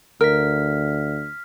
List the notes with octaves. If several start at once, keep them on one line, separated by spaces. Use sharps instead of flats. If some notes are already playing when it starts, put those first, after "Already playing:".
D2 A#4 F6 B6